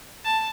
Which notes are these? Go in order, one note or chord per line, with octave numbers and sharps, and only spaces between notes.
A5